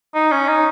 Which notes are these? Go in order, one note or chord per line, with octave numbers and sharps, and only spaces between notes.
D#4
C#4
D#4